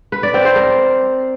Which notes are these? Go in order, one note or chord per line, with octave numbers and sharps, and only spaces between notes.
B4
D5
C4
C5
A#4